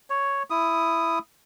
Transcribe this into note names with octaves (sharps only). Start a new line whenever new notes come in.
C#5
E4 D#6